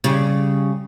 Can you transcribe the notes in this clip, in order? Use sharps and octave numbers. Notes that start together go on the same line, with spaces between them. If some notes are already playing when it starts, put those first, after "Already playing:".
C#3 G3